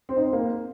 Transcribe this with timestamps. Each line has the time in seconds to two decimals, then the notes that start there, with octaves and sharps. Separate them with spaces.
0.09 C4
0.17 D#4
0.25 C4
0.33 A#3